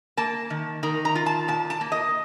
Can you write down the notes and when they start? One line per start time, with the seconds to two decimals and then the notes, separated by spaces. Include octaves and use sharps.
0.17 A#3 A5
0.50 D#3
0.83 D#3 A#5
1.05 A#5
1.15 F4
1.26 A5
1.48 A#2 A5
1.70 A5
1.81 A#3
1.92 D#5